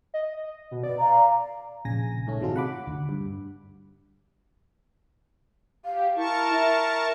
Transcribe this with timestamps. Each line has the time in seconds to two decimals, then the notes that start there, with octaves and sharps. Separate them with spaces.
0.14 D#5
0.71 B2
0.83 B4 D5
0.99 F5 A#5
1.85 A#1 C#3 G#5 A#6
2.27 G#2 A3 C#4
2.41 C3 D#3 F#3 G#3 F4 A4
2.56 F#5 B5 D6
2.87 D2
3.09 G2
5.85 G4 F5
6.16 E4 A#4 A5 C#6
6.53 E5